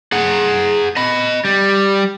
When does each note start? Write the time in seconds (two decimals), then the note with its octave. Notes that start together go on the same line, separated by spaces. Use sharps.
0.12 G#4 F#5
0.97 D#5 B5
1.45 G3